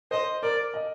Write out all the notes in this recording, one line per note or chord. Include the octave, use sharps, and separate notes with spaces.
C5 D#5
A#4 D5
D#5